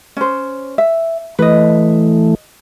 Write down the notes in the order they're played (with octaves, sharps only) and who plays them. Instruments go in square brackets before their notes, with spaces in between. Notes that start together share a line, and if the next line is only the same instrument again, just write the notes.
[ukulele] C#4 C5
E5
[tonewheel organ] E3 A3 [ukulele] B4 D#5